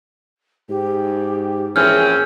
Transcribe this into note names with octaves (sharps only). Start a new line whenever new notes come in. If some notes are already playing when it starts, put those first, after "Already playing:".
G#2 G4
A#1 E3 C4 C#4 G#4 F6 G6